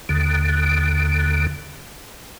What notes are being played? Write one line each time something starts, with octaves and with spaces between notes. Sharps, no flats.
D#2 D3